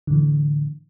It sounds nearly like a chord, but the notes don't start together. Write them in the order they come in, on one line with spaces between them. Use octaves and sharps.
D3 A2 E3